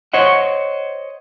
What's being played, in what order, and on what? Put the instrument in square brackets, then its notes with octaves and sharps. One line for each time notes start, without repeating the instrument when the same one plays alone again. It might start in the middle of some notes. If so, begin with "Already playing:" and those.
[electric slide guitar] C5 C#5 D#5 F#5